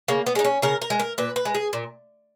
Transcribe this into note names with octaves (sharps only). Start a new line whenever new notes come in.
C#3 A#3
B3
G#3 D#4
C#4
C#3 A#4
A#4
G#3
A#4
A#2 B4
B4
G#3
G#4
A#2